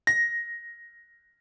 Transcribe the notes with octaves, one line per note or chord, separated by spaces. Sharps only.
A#6